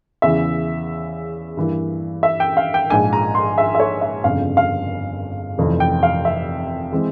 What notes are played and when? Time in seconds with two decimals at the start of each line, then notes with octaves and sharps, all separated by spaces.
0.22 E2 C#3 E3 E5
1.57 G2 E3 A#3
2.23 E5
2.40 G5
2.57 F5
2.74 G5
2.90 A#1 G#2 F3 G#5
3.13 A#5
3.35 C6
3.58 E5
3.75 E5
3.80 C#5
4.01 E5
4.24 G1 F2 C#3 F5
4.57 F5
5.58 F1 F2 C3 E3
5.80 G5
6.03 F5
6.25 E5
6.92 E3 G#3 C4